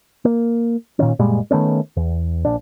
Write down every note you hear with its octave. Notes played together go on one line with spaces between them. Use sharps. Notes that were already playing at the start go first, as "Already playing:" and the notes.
A#3
A#2 D#3 C#4
F#1 A#2 G3 G#3
D#3 A3 B3 C#4
E2
A#1 D4